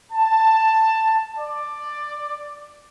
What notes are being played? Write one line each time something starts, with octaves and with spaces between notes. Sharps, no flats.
A5
D5